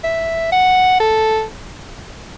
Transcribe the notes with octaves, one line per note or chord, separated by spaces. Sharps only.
E5
F#5
A4